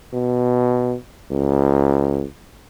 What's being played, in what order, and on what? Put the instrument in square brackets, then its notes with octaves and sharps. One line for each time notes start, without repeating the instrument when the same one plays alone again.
[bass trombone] B2
C#2